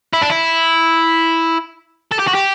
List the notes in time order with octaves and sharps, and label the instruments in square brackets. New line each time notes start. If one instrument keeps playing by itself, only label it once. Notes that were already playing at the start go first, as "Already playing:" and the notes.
[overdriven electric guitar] E4
D4
E4
A4
G4
F#4
G4